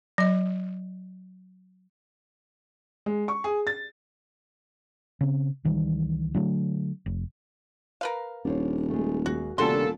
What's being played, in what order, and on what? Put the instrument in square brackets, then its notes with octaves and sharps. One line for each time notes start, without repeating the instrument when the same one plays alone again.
[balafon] F#3 D#5
[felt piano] G#3
C#6
G#4
A6
[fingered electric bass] C#3 C4
C#2 D#3 E3 G3
D3 F#3 A3
F1
[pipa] A#4 B4 F5
[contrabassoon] D#1 [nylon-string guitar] D4 C5 C#5
[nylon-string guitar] G#3 A3
[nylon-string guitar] D#2 G#3 [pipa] F#4
[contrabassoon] E1 [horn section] A#2 A4 [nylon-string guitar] C#3 D4 G4 [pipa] F#4 C6